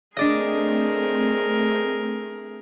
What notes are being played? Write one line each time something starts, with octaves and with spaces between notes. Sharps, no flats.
A3 C4 D4 G#4 A#4 D5 D#5